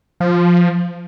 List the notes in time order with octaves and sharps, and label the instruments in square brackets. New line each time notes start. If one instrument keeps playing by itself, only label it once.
[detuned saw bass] F3